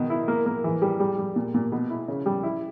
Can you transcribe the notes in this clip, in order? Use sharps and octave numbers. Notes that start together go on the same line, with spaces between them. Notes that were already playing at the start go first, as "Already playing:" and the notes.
Already playing: B2 D#3
E4
A#3
A#3
E3
G3
G3
G3
A#2
A#2
B2
E4
C#3
G3
E4